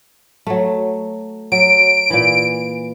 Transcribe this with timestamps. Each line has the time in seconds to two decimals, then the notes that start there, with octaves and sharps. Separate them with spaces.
0.47 F#3 A3
1.52 F#3 D7
2.10 A#2 E3